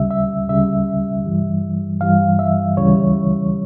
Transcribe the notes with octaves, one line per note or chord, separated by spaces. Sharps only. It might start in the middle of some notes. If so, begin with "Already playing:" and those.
Already playing: D2 C#3 G3 E5
E5
D2 C#3 G3 E5
G2 E3 G3
G2 E3 G3 F5
E5
D2 C#3 E3 G3 C#5